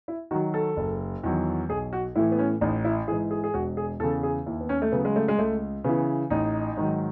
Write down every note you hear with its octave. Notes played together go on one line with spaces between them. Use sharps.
E4
D#3 F#3 F#4
A4
F#1
E2 D#3 F#3
B1 G#4
F#4
A2 E3 E4
B3
C#4
A1 D#4
E4
G#2 E3 G#4
G#4
G#4
E1 F#4
G#4
E2 C#3 A4
G#4
D#2 E4
B3
C#4
A3
C#3 F#3 B3
G#3
A3
G#3
C#2 A3
C#3 E3 B3
A1 D#4
G#2 D#3 F#3